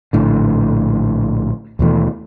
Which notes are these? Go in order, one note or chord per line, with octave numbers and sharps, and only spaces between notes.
A#1 A2 D3
D#2 B2 E3 A3